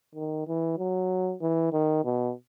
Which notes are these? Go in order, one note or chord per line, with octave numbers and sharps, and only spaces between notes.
D#3
E3
F#3
E3
D#3
B2